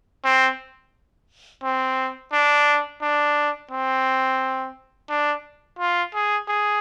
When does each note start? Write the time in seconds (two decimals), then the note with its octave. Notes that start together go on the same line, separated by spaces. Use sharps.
0.24 C4
1.63 C4
2.33 D4
3.02 D4
3.71 C4
5.09 D4
5.79 F4
6.14 G#4
6.48 G#4